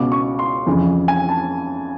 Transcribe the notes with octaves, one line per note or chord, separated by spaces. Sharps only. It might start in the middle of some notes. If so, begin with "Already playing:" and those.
Already playing: C#2 B2 D6
C#6
C6
F2 C#3 E3
G#5
A5